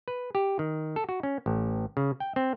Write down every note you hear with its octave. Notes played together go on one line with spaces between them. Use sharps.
B4
G4
D#3
A4
F#4
C#4
A1
C#3
G5
C4